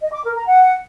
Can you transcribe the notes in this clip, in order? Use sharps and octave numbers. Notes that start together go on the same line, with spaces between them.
D#5
D6
A#4
A#5
F#5